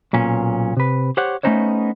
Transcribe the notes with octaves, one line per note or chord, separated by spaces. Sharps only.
B1 A#2 C#4
C3 B4
G4 C5 C#5 F#5
A3 B3 C#4 D#4 C5 C#5